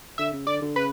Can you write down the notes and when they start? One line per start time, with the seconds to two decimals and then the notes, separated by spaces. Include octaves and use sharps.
0.18 D3 E5
0.33 C#3
0.47 D3 D5
0.62 D3
0.76 C#3 B4